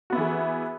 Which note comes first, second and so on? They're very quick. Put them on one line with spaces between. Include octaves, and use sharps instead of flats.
F#4 B3 E4 E3 G#4